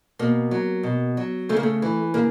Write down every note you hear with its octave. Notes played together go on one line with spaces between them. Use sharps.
B2 A#3
F#3
B2
F#3
C#3 A3
A#3
A3
E3
C#3 A#3